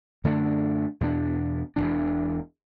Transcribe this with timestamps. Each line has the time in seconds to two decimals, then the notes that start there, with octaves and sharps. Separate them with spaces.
0.24 F#2 D3 A3 D4
1.01 E2 B2 B3 D4
1.76 E1 E2 E3 D4